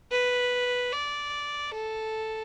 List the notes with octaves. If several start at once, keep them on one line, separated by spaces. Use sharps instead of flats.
B4
D5
A4